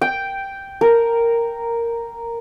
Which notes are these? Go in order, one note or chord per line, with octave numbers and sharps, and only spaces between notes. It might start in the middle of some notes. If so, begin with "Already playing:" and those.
G5
A#4